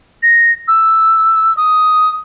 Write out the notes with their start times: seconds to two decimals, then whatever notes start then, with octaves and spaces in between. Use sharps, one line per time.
0.23 A#6
0.68 E6
1.57 D#6